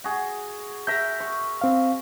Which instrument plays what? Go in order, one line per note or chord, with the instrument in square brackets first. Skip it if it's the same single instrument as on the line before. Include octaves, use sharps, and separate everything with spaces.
[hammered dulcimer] F#4 G#4
[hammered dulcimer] A#4 E5 A#5 [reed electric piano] G6
[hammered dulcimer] C#6
[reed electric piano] C4 F5